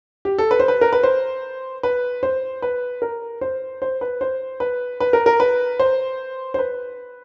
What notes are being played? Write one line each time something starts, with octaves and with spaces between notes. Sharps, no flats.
G4
A4
B4
C5
B4
A#4
B4
C5
B4
C5
B4
A#4
C5
C5
B4
C5
B4
B4
A#4
A#4
B4
C5
C5
B4